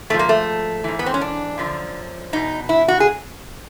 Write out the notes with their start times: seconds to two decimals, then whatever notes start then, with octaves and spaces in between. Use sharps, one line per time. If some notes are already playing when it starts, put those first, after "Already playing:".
0.10 G#2 F3 A3
0.19 A#3
0.29 A3
0.84 G#2 E3
0.99 B3
1.06 C4
1.14 C#4
1.21 D4
1.58 F#2 D3 F3
2.33 E2 B2 D#4
2.69 E4
2.88 F#4
3.00 G#4